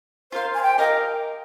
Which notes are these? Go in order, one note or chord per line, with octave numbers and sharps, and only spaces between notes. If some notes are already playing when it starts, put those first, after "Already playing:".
F4 A#4 C5 F5
G#5
G5
G4 A#4 D#5 F5